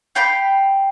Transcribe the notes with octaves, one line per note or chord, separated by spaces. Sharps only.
F5 G5 B5 G6